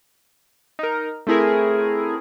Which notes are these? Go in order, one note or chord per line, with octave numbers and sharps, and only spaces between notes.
D#4 A#4
A3 C4 E4 G#4 A#4